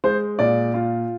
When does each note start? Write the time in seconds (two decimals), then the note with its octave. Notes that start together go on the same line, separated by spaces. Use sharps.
0.04 G#3 C5
0.39 A#2 D5
0.74 F4